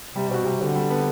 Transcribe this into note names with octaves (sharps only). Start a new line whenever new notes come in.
C3 G3
B2 C4 F#4
C3 G3
D3 C4 F#4
G3
B3 D4